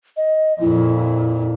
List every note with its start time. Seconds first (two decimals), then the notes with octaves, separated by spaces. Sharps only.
0.17 D#5
0.61 F2 A#2 E4